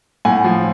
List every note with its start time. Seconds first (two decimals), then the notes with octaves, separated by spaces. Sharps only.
0.25 A2 F#5 G#5
0.44 F3